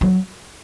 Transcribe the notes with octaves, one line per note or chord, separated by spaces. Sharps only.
F#3